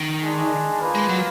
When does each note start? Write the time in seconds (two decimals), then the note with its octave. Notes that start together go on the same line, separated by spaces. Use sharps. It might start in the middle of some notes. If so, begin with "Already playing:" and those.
Already playing: D#3
0.21 G#3 D4 G#4
0.80 A#3 F4 B4
0.95 G#3
1.09 F#3